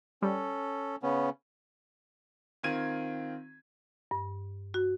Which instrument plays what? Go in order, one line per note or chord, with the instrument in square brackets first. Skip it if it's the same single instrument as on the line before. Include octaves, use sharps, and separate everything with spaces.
[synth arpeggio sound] G3 [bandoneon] C#4 A4
[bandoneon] C#3 B3 C#4
[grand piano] D#3 C4 F4 G#6 D#7
[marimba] G2
F#4